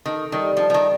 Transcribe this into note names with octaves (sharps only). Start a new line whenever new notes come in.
D#3 A4
D#3 G3
F3 D#4
F3
D#3